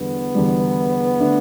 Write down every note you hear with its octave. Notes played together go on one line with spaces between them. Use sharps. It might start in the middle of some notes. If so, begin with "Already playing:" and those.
Already playing: E2 D3 G3 B3
E2 D3 G3
D3 A3 D4